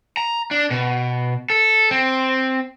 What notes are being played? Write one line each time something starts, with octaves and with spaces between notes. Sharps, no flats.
A#5
D4
B2
A4
C4